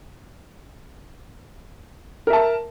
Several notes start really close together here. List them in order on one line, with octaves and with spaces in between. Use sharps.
A#4 E5 A5